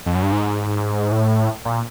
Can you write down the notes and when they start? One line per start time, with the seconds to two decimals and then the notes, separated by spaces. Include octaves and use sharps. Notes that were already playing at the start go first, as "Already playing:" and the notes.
0.06 F2
0.15 F#2
0.23 G2
0.32 G#2
1.12 A2
1.65 A#2